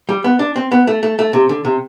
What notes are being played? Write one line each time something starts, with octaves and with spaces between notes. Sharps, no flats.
G3
B3
D4
C4
B3
A3
A3
A3
C3
D3
C3